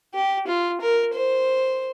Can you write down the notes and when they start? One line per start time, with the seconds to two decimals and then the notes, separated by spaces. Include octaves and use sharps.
0.15 G4
0.48 F4
0.81 A#4
1.14 C5